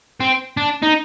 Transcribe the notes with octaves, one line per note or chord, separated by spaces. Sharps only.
C4
D4
D#4